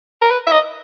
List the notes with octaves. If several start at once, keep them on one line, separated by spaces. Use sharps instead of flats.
A#4
B4
E5
D#5